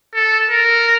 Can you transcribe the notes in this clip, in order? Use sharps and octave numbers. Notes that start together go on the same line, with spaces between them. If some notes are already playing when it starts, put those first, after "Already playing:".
A4
A#4